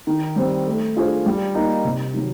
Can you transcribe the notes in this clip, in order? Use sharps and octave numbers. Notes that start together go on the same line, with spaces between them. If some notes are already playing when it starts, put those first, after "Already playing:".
D#3
G3 C4
A3
D4 F4 G#4 C5
G3
A#3 D#4
C3
D#3 F#3